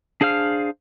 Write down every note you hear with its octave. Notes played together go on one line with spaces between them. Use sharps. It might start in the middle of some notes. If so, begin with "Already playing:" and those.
D4 G#4 C5 F5 F6